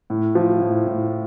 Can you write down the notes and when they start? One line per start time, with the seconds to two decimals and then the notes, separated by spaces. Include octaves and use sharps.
0.10 A2
0.35 F3
0.61 A2
0.87 A2